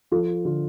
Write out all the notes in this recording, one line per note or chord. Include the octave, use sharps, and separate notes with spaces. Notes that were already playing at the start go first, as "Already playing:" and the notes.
F3 F4 A4
D3 F4